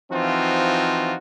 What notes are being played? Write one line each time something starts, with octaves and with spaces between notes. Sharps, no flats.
E3 F3 C4 D#4 F4 F#4